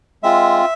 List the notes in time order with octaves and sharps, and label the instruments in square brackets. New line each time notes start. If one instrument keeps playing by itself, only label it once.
[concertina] G#3 C4 F4 E5